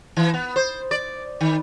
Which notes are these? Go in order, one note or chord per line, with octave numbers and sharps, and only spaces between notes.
E3
B3
C5
D5
D#3